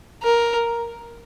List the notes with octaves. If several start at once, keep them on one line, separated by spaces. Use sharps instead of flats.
A#4